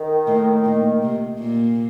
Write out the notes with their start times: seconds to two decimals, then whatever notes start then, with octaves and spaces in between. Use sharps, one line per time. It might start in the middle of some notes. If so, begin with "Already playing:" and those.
Already playing: D#3
0.27 A2
0.64 A#2
1.02 C3
1.40 A#2